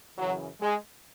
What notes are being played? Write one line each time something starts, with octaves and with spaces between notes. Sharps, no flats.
F#2 C#3 E3 F#3
G#3